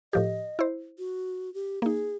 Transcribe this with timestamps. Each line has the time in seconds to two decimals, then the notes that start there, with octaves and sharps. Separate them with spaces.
0.13 A2 F3 G4 D#5
0.59 E4 C5
0.98 F#4
1.54 G4
1.82 A#3 D#4 G#4